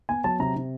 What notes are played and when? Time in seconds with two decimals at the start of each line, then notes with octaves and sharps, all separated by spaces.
0.09 B3 G#5
0.24 F#3 A5
0.40 C3 A#5
0.56 C3